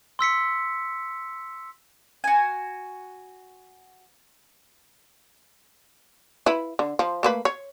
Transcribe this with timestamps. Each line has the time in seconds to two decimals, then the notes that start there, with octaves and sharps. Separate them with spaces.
0.19 C6 E6 B6 C#7
2.24 F#4 G#5
6.46 E4 B4
6.79 D3
6.99 F3
7.23 A3 A#3 B4
7.45 C#5